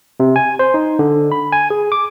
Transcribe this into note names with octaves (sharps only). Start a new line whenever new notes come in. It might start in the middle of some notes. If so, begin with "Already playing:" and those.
C3
G#5
C5
D#4
D3
B5
G#5
G#4
D6